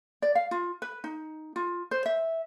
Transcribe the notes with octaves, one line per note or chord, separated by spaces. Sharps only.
D5
F5
F4
B4
D#4
F4
C5
E5